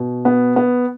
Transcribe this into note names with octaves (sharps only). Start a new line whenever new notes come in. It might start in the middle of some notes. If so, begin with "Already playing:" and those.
Already playing: B2
B3
B3